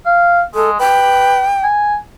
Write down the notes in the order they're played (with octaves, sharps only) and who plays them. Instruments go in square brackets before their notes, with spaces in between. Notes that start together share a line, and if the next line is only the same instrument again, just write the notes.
[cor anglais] F5
[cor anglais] G#3 [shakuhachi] A4
[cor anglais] B4 [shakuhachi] G5
[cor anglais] G#5